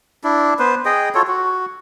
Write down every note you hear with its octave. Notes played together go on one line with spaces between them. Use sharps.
D4 E4
B3 B4 C5
G#4 D#5 G5
F4 F#4 A4 C#5
F#4